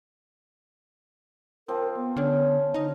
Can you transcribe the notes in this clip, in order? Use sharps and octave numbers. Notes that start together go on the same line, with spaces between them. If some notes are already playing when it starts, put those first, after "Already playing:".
F3 C4 A#4
B3
D3 C#4
D3 D#4